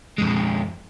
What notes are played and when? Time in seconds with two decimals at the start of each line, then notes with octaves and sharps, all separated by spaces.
0.18 F2 G#3